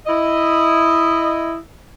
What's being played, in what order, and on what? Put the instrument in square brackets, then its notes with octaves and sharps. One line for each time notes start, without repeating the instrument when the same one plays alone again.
[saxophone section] E4 D#5